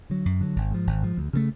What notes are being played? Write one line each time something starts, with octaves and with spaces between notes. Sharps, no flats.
D3 F#3
F#2
D3 F#3
G#1
G#2 F3
G#1
G#2 F3
D2
C#3 E3 A3